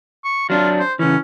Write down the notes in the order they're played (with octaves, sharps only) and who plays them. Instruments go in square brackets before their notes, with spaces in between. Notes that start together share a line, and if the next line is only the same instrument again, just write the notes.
[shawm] C#6
[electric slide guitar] F#3 D4 [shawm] F4
[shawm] C5
[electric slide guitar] C#3 E3 [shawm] C#4